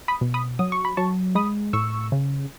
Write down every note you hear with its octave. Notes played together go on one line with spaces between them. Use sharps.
B5 D#6
B2
B5 D#6
F#3 D#6
C#6
B5
F#3 A5 C#6
G#3 B5 D#6
A2 C#6 E6
C#3